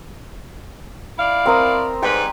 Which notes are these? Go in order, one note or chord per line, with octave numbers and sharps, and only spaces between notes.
E4 D5 F5
C4 A#4 D#6
G#2 G3 B4 G5